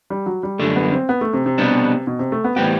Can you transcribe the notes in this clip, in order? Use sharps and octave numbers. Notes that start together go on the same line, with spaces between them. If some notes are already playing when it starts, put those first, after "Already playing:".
G3
F#3
G3
F#2 D3 G3 A3
B3
C4
B3
A3
C3
C3
B2 G3 B3 D4
B2
C3
A3
B3
A2 E3 G3 B3 C4 G4